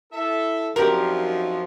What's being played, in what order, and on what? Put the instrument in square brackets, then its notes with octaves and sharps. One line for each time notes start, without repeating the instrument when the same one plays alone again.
[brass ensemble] E4 A4 [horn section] E5
[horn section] F#2 F3 [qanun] C4 G4 D5 [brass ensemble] D#4 F4 [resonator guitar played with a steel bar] A#4